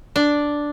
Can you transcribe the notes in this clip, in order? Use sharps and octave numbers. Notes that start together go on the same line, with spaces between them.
D4